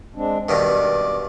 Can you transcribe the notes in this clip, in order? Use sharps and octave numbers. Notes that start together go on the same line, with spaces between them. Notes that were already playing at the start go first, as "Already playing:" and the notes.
G#3 C4 D4
G2 B2 D#3 D5